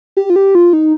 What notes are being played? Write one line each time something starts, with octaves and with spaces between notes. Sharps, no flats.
G4
F4
G4
F4
D#4